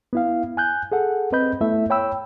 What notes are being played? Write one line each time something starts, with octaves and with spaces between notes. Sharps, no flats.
B3 E4 F5
G#5 F#6 G6
G#4 A4 F#5
C4 B4 D#5 B5 G6
A3 B3 E4 A4 E5
C#5 G5 B5 E6